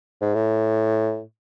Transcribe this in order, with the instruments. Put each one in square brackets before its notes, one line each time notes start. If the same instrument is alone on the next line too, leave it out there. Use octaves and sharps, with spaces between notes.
[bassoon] G#2
A2